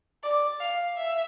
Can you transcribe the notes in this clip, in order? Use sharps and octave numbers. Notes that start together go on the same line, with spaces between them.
D5
F5
E5